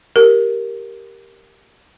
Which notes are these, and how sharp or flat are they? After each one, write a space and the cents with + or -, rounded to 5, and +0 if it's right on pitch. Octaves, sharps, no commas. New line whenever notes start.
G4 +0 A#4 +0